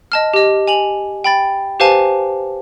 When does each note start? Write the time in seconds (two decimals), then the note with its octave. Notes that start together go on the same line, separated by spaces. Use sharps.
0.12 D#5 A5 F6
0.33 G4 D#5
0.67 G#5 F7 F#7
1.24 G5 B5 A6
1.80 G4 B4 C5 F5 G#5 A5